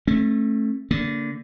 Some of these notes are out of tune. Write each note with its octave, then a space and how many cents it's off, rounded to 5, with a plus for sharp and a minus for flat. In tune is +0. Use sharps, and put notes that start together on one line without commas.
A3 +0 C#4 -40
D3 -20 A#3 -5